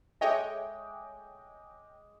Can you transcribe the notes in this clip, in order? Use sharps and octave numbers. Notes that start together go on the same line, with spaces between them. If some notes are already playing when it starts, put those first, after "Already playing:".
G#3 G#4 A4 C#5 D#5 E5 G5 D6